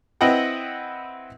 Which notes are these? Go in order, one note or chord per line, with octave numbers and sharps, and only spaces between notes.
C4 E4 B4 D#5 F#5 G5